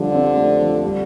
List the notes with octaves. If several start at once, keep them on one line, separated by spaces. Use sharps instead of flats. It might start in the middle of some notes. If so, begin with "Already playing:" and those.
Already playing: D3 F3 G3
C4
A3
F3
G3